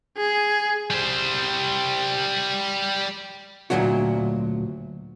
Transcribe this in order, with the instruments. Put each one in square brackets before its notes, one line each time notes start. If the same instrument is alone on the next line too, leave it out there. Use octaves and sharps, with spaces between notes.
[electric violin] G#4
[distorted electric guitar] G3 C5
[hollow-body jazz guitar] D2 G2 A#2 F#3 D4 F#4